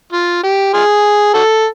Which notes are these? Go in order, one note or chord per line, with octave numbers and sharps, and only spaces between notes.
F4
G4
F4 G#4
F#4 A4